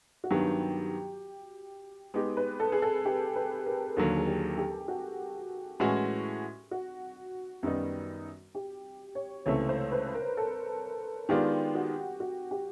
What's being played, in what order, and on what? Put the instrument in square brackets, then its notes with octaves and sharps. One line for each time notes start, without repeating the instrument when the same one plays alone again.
[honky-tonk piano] F#4
[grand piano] G2 D#3 F#3 B3 [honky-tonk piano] G4
[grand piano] G#3 B3 D#4 G4
[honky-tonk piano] B4
A4
G#4
A4
G4
B4
A#4
[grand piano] D#2 D3 F#3 A#3 [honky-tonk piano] A4
[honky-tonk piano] G#4
G4
G4
F#4
[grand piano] A2 E3 G#3 C#4 F#4
[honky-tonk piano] F#4
[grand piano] F#2 D#3 G3 B3 D#4
[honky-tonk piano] G4
C#5
[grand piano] C#2 C3 E3 A3 [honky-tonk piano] C#5
[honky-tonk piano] C5
B4
A#4
A4
[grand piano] D#3 G#3 B3 D4 F4 [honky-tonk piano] G4
[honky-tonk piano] F#4
F#4
G4